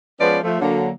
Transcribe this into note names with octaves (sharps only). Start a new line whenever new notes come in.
F3 G#3 B3 C#4 B4 D5
F3 A3
D3 F#3 A#3